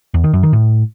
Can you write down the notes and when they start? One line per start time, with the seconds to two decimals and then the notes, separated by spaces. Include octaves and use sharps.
0.14 E2
0.24 D#3
0.33 F#2
0.43 D#3
0.53 A2